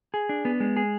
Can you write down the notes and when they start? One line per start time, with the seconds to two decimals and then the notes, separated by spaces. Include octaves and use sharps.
0.14 G#4
0.29 D4
0.45 B3
0.60 G#3
0.77 G#4